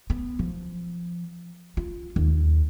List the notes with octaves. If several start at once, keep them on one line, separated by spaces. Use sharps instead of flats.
B3
F3
F4
D#2